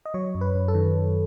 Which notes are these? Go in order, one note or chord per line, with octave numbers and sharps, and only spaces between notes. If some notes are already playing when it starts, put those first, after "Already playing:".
D#5
F#3 C#5
F#2
B4
F#2
A4
D#3